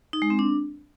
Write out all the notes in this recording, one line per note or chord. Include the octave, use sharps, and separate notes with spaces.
D#4
G#3
C4
D4